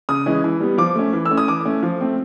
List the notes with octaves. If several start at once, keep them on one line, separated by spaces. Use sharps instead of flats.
C#3 D#6
E3 G#3 C#4
E3
G3 B3
F3 D6
A3 C#4
E3
E6
A3 C#4
D#6
E3 D6
A3 C#4
F3
A3 C4